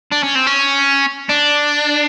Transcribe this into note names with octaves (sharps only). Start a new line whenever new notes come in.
D4
C#4
C4
C#4
D4